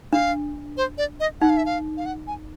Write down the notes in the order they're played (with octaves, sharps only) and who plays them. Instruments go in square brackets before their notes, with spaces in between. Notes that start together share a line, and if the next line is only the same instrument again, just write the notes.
[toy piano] D4 [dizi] F5
[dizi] C5
D5
D#5
[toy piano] D#4 [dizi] F#5
[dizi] F5
E5
F5
F5
F#5
G#5